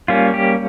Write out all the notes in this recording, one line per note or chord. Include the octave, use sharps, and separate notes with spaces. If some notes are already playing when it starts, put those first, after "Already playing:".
G3 A#3 C#4 F4
G4